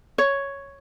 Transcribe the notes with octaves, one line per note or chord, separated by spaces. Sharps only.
C#5